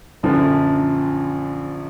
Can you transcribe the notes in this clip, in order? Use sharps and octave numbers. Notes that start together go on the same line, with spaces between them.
A#1 F#2 D3 F3